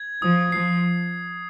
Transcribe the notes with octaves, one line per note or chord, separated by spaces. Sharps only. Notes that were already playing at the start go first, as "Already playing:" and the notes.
Already playing: G#6
F3 D#6
F3 C7